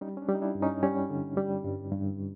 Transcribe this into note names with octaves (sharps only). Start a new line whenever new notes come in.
G3 C#4 D#4
C#4
D4
G3
D#4
D4 E4
G2
C#4 D#4
G3 C#4
D3
G3
G2
G2